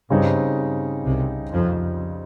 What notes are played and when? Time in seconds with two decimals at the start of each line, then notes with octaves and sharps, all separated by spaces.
0.10 G2 C#3 G3 C4 D#4
1.05 C2 C3
1.52 F2 F3